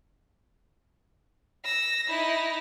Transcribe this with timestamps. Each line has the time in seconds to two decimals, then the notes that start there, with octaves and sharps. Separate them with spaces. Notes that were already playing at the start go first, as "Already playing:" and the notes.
1.65 E6 A#6
2.08 D#4 E4